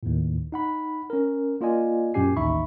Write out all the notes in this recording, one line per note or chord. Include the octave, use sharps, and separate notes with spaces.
D#2 A2
D#4 F#5 B5
C#4 A#4
A#3 F4 D5 D#5 G#5
F#2 A#2 C#4 G4 G#5 C7
A1 D#2 D#4 E5 B5 C#6